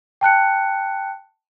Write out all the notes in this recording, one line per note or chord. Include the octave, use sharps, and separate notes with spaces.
G5 A5 F#6 C#7